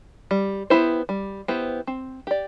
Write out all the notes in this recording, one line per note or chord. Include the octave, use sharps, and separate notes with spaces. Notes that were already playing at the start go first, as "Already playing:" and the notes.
G3
B3 E4 G4 C5
G3
B3 E4 G4 C5
C4
G4 D5